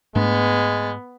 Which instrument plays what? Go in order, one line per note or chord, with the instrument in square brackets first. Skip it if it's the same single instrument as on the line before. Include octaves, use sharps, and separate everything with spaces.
[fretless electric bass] G#2 A3 D4 [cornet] G#3 [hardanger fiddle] B3